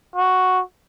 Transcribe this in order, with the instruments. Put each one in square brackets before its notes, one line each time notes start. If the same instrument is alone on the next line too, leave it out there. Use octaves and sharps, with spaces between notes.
[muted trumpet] F#4